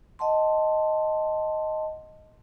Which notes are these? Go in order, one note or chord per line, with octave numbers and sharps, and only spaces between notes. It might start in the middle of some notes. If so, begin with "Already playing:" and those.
D#5 F#5 A5 C6